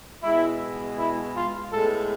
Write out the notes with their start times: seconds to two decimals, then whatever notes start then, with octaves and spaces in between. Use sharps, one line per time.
0.23 B2 G#3 B3 E4
0.97 E4
1.35 F4
1.72 A2 G#3 B3 A4